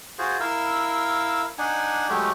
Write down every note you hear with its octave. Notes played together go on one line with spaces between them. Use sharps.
F4 F#4 G#4 C5
E4 A#4 F5 E6
D4 D#4 F#5 G#5
F#3 G#3 A3 G4